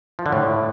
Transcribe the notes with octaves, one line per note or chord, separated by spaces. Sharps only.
F3
D3
A2